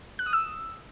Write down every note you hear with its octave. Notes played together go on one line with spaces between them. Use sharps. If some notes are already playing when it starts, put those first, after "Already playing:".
F#6
D#6
E6